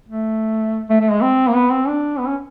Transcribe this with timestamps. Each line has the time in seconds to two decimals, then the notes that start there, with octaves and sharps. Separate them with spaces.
0.08 A3
0.90 A3
1.00 A3
1.11 G#3
1.21 C4
1.47 A#3
1.54 B3
1.70 C4
1.87 D4
2.19 B3
2.28 C#4